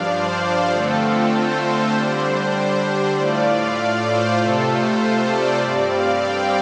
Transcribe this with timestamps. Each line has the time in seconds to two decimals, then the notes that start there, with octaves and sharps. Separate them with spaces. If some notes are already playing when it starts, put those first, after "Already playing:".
Already playing: G2 F3 D4 D5 F5
0.10 C5
0.71 D3 A3 C4 F4 A4
1.01 A4
1.32 C5
1.92 D3 G3 D4 C5
2.23 C5
2.53 C5
3.14 A2 A3 F4 D5
3.45 F5
4.06 C5
4.36 C3 A3 F4 A4
4.66 C5
4.96 C5
5.27 D5
5.57 G2 G3 C4
5.87 F5
6.18 G5